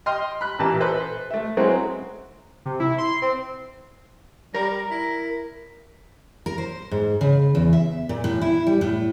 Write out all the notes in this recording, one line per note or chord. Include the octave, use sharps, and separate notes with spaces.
D#5 G5 C6 F6
B5 F#6
A1 A#2 E3 A5
A4 B4 C5
A3 E5
F#3 G#3 C4 C#4 E4 F#4
C3
E4
C6
C4
G3 A#4 A#5
E4
A#4
C5
G#2
C#3
E2
E5
A#2
A2
E4
G3
A2